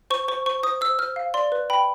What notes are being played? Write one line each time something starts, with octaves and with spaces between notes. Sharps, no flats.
C5 C#6
C5 C#6
C5 C#6
C5 D#6
C5 E6
C5 F6
F5
D5 C6
B4
G5 B5